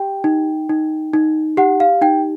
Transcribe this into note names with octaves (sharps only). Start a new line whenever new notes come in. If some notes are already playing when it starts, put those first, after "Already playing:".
Already playing: G4 G5
D#4
D#4
D#4
G4 F#5
F5
D#4 G5